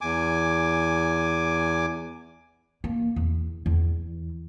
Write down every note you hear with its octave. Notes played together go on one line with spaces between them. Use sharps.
E2 G#5 D6
A#3
E2
E2